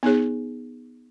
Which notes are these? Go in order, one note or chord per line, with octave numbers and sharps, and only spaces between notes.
B3 D#4 G#4 C#5